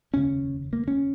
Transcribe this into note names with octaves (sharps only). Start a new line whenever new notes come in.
F1 D#2 C#3 C#4
A#3
C#4